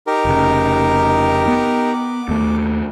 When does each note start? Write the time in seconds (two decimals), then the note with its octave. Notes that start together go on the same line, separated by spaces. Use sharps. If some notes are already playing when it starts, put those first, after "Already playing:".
0.07 D#4 G4 A#4
0.25 F1 C#3
1.48 B3
1.93 D6
2.29 D#2 A3